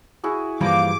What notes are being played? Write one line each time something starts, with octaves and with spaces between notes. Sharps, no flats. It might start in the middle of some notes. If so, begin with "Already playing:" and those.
E4 F#4 G#4
G2 E3 F3 A#3 D6